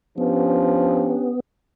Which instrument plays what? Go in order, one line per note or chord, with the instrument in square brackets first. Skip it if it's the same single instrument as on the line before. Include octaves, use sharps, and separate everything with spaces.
[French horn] F3 [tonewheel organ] B3 [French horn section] C#4 D4 G4